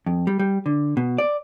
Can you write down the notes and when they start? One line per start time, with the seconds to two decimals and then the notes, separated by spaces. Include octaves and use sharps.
0.06 F2
0.27 G3
0.39 G3
0.66 D3
0.97 B2
1.18 D5